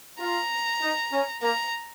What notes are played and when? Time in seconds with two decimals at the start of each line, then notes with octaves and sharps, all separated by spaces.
0.20 F4 A#5
0.82 D#4
1.12 C#4
1.42 A#3 A#5